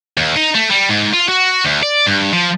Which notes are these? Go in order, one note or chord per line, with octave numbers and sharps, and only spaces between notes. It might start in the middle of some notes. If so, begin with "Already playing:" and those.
D#2
D#4
A3
G3
G#2
F4
F#4
D2
D5
G2
F3